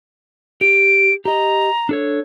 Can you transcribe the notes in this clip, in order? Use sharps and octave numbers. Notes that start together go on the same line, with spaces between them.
G4 D7
G4 D#5 A#5
D4 A4 C#5